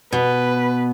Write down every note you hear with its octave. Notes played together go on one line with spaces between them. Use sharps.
B2 B4